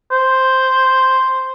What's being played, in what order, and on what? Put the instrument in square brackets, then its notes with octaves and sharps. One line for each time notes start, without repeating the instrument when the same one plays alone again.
[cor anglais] C5